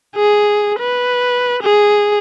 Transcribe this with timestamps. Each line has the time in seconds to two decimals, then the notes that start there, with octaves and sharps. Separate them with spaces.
0.16 G#4
0.80 B4
1.63 G#4